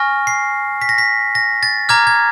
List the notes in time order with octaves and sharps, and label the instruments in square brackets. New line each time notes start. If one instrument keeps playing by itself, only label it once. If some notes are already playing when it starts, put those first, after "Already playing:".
Already playing: [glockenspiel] G#5 C#6 F6 A#6
C7
B6
A#6
B6
A#6
A6
A#5 D6 F6 G#6
G#6